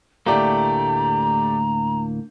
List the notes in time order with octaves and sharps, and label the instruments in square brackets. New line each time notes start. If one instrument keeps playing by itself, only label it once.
[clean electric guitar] D2 A2 A#3 [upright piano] A3 G4 D5 [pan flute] A#5